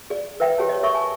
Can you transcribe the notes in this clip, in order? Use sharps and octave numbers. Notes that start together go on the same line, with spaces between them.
G#4 D5
A#4 B4 E5 G5
G4 G#4 C#5 A5
C#5 D#5
A#4 E5 C#6
G#5 A5